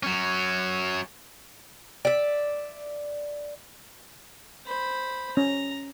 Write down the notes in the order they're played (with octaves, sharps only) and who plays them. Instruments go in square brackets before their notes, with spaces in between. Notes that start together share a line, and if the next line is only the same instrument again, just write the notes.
[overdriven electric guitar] F#3 C#4
[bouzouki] D5 E5
[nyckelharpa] C5 B5
[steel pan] C#4 [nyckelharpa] A#5